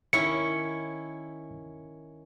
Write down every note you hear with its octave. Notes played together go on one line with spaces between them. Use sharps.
D#3 C#4 E4 C#7